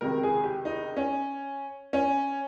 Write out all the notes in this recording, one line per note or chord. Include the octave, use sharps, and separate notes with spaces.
C#2 C3 D#3 A#4
G#4
G4
D#4
C#4
C#4